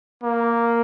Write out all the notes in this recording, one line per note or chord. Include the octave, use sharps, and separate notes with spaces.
A#3